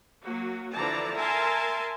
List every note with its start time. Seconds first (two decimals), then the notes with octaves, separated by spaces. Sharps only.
0.24 F#3 A#3 F#4
0.75 D3 E3 F3 D5 A5 A#5
1.17 A#4 E5 G#5 A5 C6